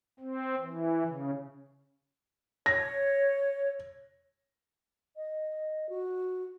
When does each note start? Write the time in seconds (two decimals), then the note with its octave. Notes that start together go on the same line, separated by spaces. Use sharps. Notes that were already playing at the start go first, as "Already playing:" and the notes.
0.20 C4
0.61 E3
1.06 C#3
2.66 C#5 A#6
5.16 D#5
5.89 F#4